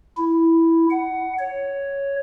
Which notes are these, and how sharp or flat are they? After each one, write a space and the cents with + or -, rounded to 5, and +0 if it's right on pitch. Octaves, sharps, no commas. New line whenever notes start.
E4 +0
F#5 +15
C#5 +5